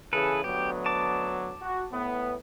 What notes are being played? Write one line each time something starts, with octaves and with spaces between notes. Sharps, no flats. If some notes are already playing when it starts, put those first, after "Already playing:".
C#3 E3 G#4 A4 B4
D2 F#3 B3 G4
A5 D6
F#4
A2 B3